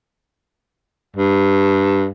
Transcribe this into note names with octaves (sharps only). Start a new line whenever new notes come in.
G2